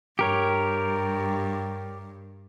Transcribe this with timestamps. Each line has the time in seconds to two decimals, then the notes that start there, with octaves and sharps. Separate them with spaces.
0.19 G2 G4 A#4 C#5